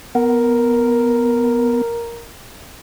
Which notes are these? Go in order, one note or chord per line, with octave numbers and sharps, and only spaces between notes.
B3 A#4